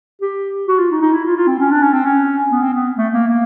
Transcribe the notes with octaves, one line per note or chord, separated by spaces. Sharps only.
G4
F#4
F4
D#4
D#4
E4
F4
F4
C4
C#4
D4
C#4
C4
C#4
B3
C4
B3
A3
A#3
A#3